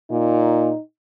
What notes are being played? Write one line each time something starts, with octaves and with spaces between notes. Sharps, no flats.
A#2 D#4